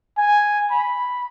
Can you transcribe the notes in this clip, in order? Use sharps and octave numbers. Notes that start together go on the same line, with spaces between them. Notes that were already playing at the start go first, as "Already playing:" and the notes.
G#5
B5